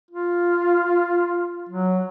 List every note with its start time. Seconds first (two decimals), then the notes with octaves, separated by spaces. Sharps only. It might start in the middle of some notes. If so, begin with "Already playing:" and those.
0.11 F4
1.69 F#3